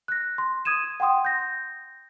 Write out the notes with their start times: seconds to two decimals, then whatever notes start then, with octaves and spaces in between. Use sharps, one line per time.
0.08 F#6 A#6
0.38 C6
0.65 D#6 G#6 D#7 E7
1.00 F#5 G5 C6 D#6
1.25 G6 A#6